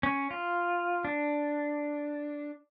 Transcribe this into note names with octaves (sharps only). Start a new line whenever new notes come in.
C#4
F4
D4